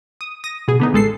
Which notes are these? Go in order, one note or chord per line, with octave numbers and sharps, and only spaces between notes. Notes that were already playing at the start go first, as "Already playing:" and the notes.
D#6
D#6 A#6
B2 G#4
D3 B3 D#4
A1 G#3 A4 C7